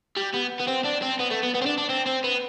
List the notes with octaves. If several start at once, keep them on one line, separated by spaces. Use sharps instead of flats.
G3
B3
B3
C4
D4
C4
B3
A3
B3
B3
C4
D4
D4
C4
C4
B3